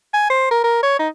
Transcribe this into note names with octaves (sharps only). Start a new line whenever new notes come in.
G#5
C5
A#4
A#4
C#5
D#4